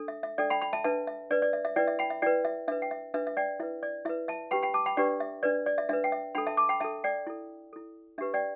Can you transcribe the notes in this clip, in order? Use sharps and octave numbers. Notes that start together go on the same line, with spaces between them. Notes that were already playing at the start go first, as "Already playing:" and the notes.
Already playing: D4 A4
E5
E5
D4 A4 D5 G5
G5 B5
G5 B5
E5 A5
D4 B4 E5 A5
E5
D4 B4 D5
D5
E5
E5
E4 B4 D5 G5
E5
G5 B5
E5
E4 B4 D5 G5
E5
D4 B4 E5
G5
E5
D4 B4 E5
E5
D5 G5
E4 B4 E5
D5
E4 B4 E5
E5 A5
D4 G4 B4 G5 B5
G5 B5
A5 D6
G5 B5
D4 G4 B4 D5 G5
E5
D4 B4 D5
D5
E5
D4 B4 E5
G5
E5
D4 A4 G5 B5
E5 A5
A5 D6
G5 B5
D4 A4 E5 A5
D5 G5
E4 A4
E4 A4
D4 G4 B4 E5
D5 G5